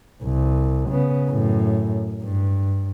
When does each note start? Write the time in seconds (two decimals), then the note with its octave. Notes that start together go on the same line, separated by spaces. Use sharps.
0.23 C2
0.90 C#3 B3
1.29 F#2 A2
2.24 G2